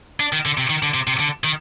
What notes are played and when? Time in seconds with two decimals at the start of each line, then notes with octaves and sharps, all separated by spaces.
0.20 D4
0.33 D#3
0.46 D3
0.58 C3
0.70 D#3
0.83 D3
0.94 C3
1.07 C3
1.20 D3
1.44 D#3